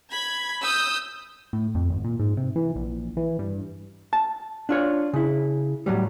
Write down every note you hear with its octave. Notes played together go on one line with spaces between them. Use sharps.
B5 G#6
D#6 E6 G6
A2
F2
G#1
A#2
G#2
C3
E3
A#1
E3
G2
A5
D4 F4 C#5
C#3 E4
A2 F#3 G3